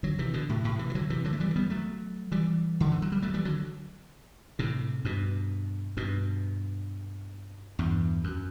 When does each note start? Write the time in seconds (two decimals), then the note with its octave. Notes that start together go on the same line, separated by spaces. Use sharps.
0.03 D3 F#3
0.19 C3 E3
0.33 B2 D3
0.49 A2 C3
0.64 A2 C3
0.79 C3 E3
0.90 E3
0.95 D3 F#3
1.10 C3 E3
1.24 D3 F#3
1.33 A3
1.40 E3 G3
1.56 G3 B3
1.70 F#3 A3
2.32 E3 G3
2.80 D3
2.92 E3
3.02 F#3
3.12 G3
3.22 F#3 A3
3.34 E3 G3
3.45 D3 F#3
4.59 A2 C3
5.05 G2 B2
5.97 G2 B2
7.79 E2 G2
8.24 F#2